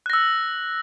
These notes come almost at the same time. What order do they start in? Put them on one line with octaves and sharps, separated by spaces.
F#6 A#6 E6